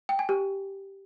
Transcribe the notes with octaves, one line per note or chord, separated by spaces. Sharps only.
G5
G#5
G4